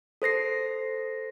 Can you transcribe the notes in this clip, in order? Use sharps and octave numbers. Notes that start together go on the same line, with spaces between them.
A4 C5 A#6 C7